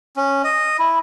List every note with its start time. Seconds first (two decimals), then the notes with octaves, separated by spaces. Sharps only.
0.16 C#4
0.44 D#5
0.79 E4